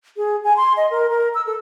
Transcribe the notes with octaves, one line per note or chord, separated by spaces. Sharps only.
G#4
G#5
C6
D#5
A#4
A#4
E6
A4